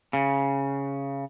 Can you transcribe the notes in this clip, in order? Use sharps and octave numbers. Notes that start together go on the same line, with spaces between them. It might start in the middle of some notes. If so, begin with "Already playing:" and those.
C#3